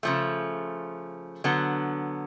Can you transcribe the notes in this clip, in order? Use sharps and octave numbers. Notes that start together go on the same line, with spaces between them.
C#3 F3 A3
D3 F#3 B3